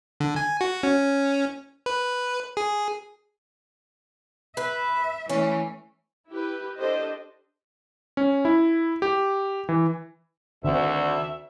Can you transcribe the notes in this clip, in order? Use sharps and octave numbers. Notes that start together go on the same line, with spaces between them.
D3
G#5
F#4
C#4
B4
G#4
B4 E5
E3 A3 C#4
E4 G4 B4
D4 G4 A4 C5 D#5
C#4
E4
G4
E3
D2 D3 D#3 C4 E5